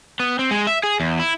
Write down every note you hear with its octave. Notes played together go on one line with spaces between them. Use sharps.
B3
C4
G#3
E5
G#4
E2
E4